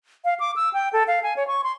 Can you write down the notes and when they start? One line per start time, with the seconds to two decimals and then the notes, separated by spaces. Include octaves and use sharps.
0.25 F5
0.40 D6
0.56 E6
0.73 G5
0.93 A4
1.08 F5
1.23 G#5
1.36 C#5
1.48 C#6
1.64 C6